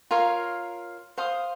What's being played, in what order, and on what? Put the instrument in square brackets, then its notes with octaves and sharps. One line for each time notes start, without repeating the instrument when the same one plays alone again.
[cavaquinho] F4 A#4 C#5 F5
C5 F5 C6 D#6